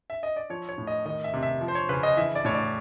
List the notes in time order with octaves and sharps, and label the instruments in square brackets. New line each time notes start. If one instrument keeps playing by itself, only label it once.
[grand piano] E5
D#5
D5
F3 C#5
C#5
A2
D#5
D#3 D#5
E5
C3
E5
F3
C5
C#5
C#3 B4
D#5
E3 E5
D5
A2 C#5
D5